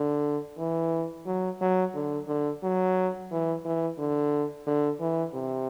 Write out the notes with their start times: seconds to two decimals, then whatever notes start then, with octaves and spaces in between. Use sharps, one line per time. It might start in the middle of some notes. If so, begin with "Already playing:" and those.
Already playing: D3
0.59 E3
1.26 F#3
1.61 F#3
1.95 D3
2.28 D3
2.63 F#3
3.31 E3
3.65 E3
3.98 D3
4.67 D3
5.00 E3
5.34 C3